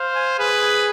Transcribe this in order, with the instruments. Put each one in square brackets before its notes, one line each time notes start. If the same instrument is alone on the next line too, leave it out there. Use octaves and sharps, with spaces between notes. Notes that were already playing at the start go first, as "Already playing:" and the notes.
Already playing: [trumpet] C5 [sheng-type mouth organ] F5
[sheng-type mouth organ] G#5
[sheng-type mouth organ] G#4 [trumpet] B4
[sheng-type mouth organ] G#5